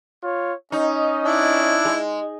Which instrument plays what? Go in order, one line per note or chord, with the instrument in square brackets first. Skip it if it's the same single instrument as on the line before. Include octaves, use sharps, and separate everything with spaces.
[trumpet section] F4 C#5
[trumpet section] C#4 D#5 [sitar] D#4
[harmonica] D4 E4
[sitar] G#3